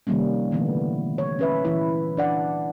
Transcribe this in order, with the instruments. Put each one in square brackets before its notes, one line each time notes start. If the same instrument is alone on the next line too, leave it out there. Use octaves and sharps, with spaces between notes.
[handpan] C3 D#3 F3 G3 A#3 C#4
A#2 D3 E3 A3 B3
C#5
C#4 B4 E5
A#2 E3 E4
D4 D5 F#5